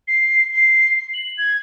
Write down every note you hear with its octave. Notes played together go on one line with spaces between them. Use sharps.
C7
C7
F#7
G#6